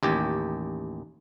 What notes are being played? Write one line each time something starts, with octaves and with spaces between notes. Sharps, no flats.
A1 D#2 G4